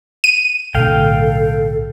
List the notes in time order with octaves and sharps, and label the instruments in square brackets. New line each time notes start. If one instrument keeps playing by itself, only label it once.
[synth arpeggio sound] D#7
[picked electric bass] B1 A2 D3 [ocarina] A4 [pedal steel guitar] F5 G5